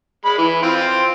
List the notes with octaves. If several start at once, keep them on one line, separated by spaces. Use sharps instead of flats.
G#3 B5
E3
C4 F4